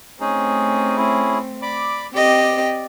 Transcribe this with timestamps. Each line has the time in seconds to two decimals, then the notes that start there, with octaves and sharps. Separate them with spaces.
0.20 A3 C4 C#4 D#4 G#4
0.97 C#4 E4 G#4
1.62 D5 B5 D6
2.14 C4 G4 D5 D#5